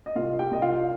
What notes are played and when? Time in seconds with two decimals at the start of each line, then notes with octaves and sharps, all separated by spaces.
0.06 D#5
0.15 C2 F4 F5
0.39 G4 G5
0.51 C2 D#5
0.62 F4 F5